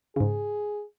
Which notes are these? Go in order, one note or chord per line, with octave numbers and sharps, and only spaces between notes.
G#2 C#3 G#4